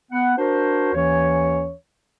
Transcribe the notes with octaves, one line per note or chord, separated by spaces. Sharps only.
B3 F#5
D4 F#4 A#4 C5
D#2 E3 C#4 C#5